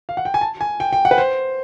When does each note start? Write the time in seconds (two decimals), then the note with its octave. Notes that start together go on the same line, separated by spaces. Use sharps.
0.09 F5
0.17 F#5
0.25 G5
0.34 G#5
0.41 A5
0.61 G#5
0.80 G5
0.93 G5
1.05 F#5
1.11 B4
1.18 C5